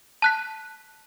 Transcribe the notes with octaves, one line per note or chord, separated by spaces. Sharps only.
A5 F#6 B6